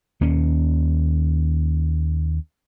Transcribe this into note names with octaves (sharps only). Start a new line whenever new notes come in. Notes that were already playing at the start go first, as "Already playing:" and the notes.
D#2 A#3 C#4